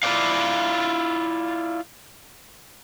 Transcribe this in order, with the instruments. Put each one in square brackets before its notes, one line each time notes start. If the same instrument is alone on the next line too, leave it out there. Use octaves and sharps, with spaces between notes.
[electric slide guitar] E4 F4 B4 C5 D5 F5